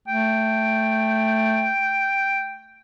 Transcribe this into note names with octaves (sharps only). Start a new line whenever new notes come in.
A3 G5